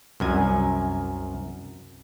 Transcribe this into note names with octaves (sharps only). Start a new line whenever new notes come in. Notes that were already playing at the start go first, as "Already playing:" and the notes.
C2 F#2 G#5